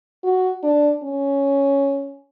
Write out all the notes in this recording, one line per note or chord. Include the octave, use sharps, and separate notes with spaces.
F#4
D4
C#4